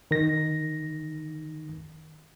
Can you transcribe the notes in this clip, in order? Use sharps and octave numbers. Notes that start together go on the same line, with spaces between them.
D#3 A#6